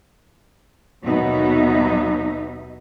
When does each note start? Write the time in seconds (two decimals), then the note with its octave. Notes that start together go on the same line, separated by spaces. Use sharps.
1.04 D#2 B2 F#3 B3 D#4 E5